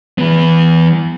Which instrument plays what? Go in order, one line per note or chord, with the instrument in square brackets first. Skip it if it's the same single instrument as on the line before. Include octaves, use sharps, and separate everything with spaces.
[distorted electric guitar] E3 B3